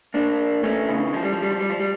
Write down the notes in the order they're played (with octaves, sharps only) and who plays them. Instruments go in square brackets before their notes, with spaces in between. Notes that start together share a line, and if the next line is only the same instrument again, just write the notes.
[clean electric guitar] A#3 D4
A3 C#4
C#3 E3
F3
G3
F3
G3
F3
G3
F3
G3